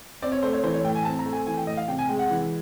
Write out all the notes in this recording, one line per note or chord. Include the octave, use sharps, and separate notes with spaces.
C4 D5
C#5
A3 C5
C#5
E3 C5
C#5
A2 G5
G#5
C4 A5
A#5
A3
G#5
E3 G#5
G5
A2 D#5
F5
C3 G5
G#5
G#3 G5
F#5
E3